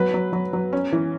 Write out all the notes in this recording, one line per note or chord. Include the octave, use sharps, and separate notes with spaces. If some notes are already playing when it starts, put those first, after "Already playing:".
Already playing: F#3 B4
F#3
F#3
F#3
C#4
E3